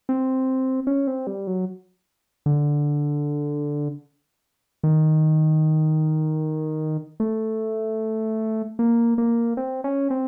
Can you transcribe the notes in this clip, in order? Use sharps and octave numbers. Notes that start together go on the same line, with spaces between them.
C4
C#4
C4
G3
F#3
D3
D#3
A3
A#3
A#3
C4
C#4
C4